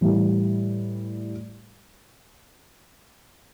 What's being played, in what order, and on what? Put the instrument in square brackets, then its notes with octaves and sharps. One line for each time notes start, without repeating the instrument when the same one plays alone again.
[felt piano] A2 E3 G3